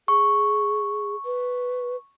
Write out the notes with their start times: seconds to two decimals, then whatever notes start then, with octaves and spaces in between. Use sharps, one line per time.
0.08 G#4 C#6
1.25 B4